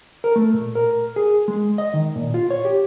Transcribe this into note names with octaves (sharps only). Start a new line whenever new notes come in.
A#4
A3
A#2
A#4
G#4
G#3
D#5
D#3
A#2
F4
C#5
G4